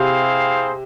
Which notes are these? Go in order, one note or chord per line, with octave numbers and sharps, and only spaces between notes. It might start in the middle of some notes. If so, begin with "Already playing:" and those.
Already playing: C3 C4 E4 G#4 C5 F5